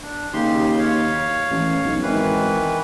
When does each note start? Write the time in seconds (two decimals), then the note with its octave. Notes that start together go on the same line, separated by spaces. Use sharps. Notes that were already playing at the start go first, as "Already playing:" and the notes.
0.03 D4
0.33 D#2 C#3 G4 C6
0.79 C#5 F5
1.51 A1
1.85 B1
2.02 G#1 D#3 E3 B4